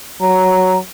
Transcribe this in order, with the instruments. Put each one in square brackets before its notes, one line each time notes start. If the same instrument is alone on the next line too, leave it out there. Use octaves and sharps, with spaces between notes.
[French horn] F#3 [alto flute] A#5